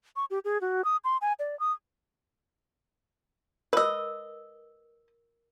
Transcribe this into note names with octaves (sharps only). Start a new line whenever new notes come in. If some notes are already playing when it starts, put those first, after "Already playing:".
C#6
G4
G#4
F#4
D#6
C6
G#5
D5
D#6
A#4 B4 D#5 E6